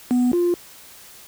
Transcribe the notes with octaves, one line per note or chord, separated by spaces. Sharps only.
B3
F4